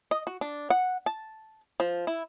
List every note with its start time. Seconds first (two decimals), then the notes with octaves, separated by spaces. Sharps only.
0.11 D#5
0.27 F#4
0.41 D4
0.70 F#5
1.06 A5
1.80 F3
2.07 E4